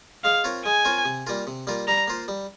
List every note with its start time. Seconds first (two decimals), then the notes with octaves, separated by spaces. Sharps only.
0.24 G#3 F5
0.44 C4 F4 A#4 C#5
0.65 G#3 G#5
0.85 C4 F4 A#4 C#5
1.05 C3
1.27 G3 A#3 F4 A#4
1.47 C3
1.67 G3 A#3 F4 A#4
1.87 G3 A#5
2.07 A#3 F4 C5
2.28 G3